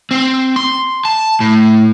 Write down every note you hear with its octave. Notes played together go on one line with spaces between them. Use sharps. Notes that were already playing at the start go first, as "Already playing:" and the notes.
C4
C6
A5
A2